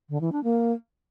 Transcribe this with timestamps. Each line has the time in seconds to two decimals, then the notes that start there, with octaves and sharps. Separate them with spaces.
0.10 D3
0.21 E3
0.32 D4
0.44 A#3